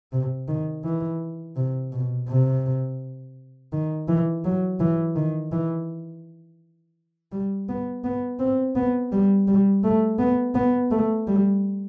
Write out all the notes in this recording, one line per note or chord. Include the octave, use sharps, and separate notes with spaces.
C3
D#3
E3
C3
B2
C3
D#3
E3
F#3
E3
D#3
E3
G3
B3
B3
C4
B3
G3
G3
A3
B3
B3
A3
G3